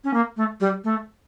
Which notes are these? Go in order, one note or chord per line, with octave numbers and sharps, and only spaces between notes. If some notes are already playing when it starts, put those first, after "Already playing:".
C#4
A#3
A3
G3
A3